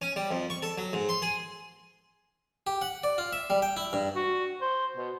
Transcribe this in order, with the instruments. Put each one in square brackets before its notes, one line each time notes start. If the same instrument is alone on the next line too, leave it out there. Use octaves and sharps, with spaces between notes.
[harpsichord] C#4
G3
F2
C#6
A4
F#3
G#2
C6
G#4
G4
F#5
D5
F4
E5
G3
G5
E4
G2
[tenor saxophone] F#4
C5
B2